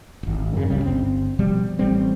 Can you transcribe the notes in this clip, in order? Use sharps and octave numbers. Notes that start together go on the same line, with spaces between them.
D#1 G#1
F#2 C#3
C#2 C#3 G3
G1 C4
B2 F3 G3
A1 G3 C4